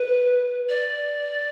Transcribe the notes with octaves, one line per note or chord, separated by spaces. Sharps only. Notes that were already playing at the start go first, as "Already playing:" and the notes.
Already playing: B4
D5